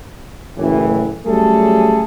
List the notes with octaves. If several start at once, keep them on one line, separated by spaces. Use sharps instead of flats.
F#1 A2 E3
F#3 G3 A3 C#4 G#4 A4